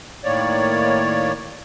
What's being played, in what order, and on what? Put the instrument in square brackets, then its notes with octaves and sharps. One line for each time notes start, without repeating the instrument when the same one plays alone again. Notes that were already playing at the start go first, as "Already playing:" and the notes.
[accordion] A2 D#3 A#3 C#5 D5